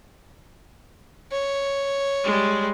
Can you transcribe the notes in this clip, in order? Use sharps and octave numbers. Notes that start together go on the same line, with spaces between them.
C#5
G3 G#3